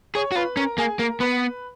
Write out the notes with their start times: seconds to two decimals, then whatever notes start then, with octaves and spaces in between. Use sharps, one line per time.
0.15 G#4 C#5 C#6
0.32 F#4
0.35 F4 B4 B5
0.57 C#4 A#4 A#5
0.78 A#3 G#4 G#5
0.99 A#3 A#4 A#5
1.20 B3 B4 B5